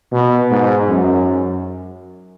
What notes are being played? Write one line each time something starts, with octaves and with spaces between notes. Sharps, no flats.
B2
G#2
F#2